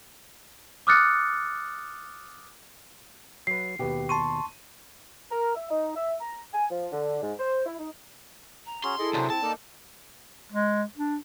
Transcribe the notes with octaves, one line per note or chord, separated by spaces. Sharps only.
D6 D#6 F6 F#6 A6 C#7
F#3 B4 C7
D#2 B2 G4 B4
A5 C6 C#6 D#7
A#4
E5
D#4
E5
A#5
G#5
F3
D3
G#2
C5
E4
D#4
A#5
C#4 F#4 G#4 C6
E4 G#4 A4 D#5
B1 C3 F#3 D4 C5
C4 A5
A#3 D#4 A4 A#4 D5
G#3
D4